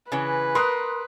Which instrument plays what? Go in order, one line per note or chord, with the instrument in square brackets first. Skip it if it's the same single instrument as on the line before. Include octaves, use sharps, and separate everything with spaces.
[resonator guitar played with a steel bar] C#3 E3 [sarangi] B4
[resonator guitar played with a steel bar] A#4 [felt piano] C6 D#6 F#6